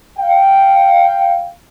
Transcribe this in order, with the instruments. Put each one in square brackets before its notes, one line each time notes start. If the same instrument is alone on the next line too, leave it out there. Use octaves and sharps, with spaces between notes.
[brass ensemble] F5 G5